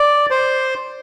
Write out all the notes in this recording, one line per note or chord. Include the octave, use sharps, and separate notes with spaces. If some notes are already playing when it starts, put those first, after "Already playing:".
Already playing: D5
C5